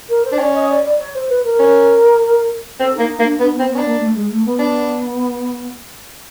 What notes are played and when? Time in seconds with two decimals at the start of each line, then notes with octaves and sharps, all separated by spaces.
0.09 A#4
0.24 C5
0.32 D4
0.39 C#4 D5
0.54 D#5
0.69 D5
0.84 D5
0.98 C#5
1.14 C5
1.29 B4
1.44 A#4
1.59 C#4
2.79 C4 A4
2.95 A#3 D#4
3.10 D#4
3.19 A#3
3.24 D4
3.39 B3 D4
3.54 B3
3.59 C4
3.70 B3
3.75 C#4
3.79 D4
3.85 A#3
3.99 A3
4.14 G#3
4.30 A3
4.45 B3
4.59 D4